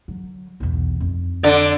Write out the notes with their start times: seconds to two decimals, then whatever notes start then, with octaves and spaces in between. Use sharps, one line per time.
0.08 D3 F#3
0.60 B1 E2
1.00 F2 D#4
1.44 D3 D5